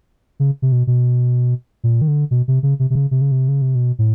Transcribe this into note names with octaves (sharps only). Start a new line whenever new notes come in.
C#3
C3
B2
B2
A#2
D#3
D3
B2
C3
C#3
C3
C3
C#3
C3
C#3
C3
C#3
C3
B2
A2